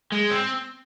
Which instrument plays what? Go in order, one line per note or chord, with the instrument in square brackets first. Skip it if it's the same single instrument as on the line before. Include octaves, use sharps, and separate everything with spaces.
[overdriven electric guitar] G#3
C4